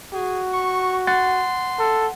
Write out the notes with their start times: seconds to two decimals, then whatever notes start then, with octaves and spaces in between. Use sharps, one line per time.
0.14 F#4 G#4
0.53 C#6
1.07 F#5 C6 A6
1.79 A4